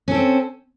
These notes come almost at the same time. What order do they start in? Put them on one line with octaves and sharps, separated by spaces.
C#4 A4 C4